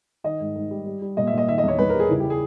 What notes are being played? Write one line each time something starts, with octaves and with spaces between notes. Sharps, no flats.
D#3 D#5
G#2
G#2
G3
G3
G3
A#2 D#5
E5
A#2 D#5
D#3 E5
D#5
E2 C#5
E2 B4
G3 A#4
G#4
C#3 E4
G3 G4
G#4